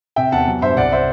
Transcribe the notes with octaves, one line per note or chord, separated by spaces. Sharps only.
C3 E5 G5
E2 F#5 A5
F#3
G2 C5 E5
C2 D5 F#5
C5 E5